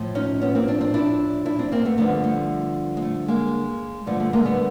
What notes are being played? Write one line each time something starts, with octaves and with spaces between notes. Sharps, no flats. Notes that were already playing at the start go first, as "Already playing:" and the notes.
Already playing: A2 F3
C#4 D#4
B3 C#4
A#3 C4
C4 D4
C4 D4
D4 E4
D4 E4
C4 D4
A#3 C4
A3 B3
G2 D3 F3 A3 B3
A3
G#3
A3
G#3 A#3
G2 D3 F3 A3
A3
G#3 A#3
A3 B3